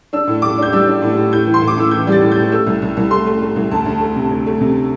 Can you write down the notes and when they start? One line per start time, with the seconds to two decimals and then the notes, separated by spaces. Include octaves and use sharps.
0.13 D4 E6
0.27 A2
0.42 A2 D6
0.58 D4 G6
0.73 G3 E6
0.87 D4
1.02 A2
1.17 A2
1.32 A2 G6
1.47 E3
1.54 C6
1.62 A2
1.68 D6
1.77 A2 E6
1.91 E3 G6
2.07 G3 A6
2.21 A2
2.32 G6
2.37 A2
2.52 A3 E6
2.67 C2
2.82 C2
2.97 C2
3.11 A3 C6
3.26 A3
3.42 A3
3.56 C2
3.71 D2 A5
3.85 D2
4.00 A3
4.16 C3
4.30 D2
4.46 A3
4.61 C3